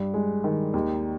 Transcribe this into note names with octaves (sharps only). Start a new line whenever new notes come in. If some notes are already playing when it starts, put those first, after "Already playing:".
Already playing: G2
G#3
D#3
D#2